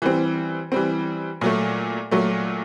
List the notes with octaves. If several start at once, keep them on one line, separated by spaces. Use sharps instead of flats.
E3 G3 C4
E3 G3 C4
A#2 F#3 A3
A#2 F#3 A3